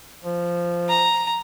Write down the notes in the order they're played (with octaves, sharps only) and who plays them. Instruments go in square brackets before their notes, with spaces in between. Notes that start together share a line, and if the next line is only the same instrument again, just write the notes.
[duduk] F3
[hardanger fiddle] A#5